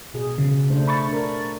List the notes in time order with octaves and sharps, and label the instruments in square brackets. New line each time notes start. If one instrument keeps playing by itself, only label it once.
[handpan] B2 G#4
[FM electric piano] C#3
[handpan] A3 D4 C5
[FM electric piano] B5 C#6 A6
[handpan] D4 A#4